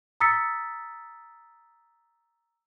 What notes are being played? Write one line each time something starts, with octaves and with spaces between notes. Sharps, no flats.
A#5 D#6 E6 A6 B6 C#7